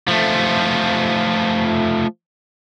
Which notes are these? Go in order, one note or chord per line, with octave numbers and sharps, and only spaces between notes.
F3 A3